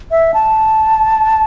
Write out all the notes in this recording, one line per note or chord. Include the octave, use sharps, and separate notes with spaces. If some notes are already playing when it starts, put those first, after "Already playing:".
E5
A5